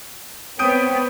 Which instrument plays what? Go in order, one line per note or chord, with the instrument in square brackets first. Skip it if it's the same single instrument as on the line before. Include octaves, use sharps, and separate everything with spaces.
[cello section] B3 [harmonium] C4 C#5 G5 [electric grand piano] D#6 G6 D7